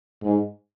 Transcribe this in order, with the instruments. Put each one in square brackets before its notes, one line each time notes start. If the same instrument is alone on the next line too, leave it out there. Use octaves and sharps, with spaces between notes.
[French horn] G#2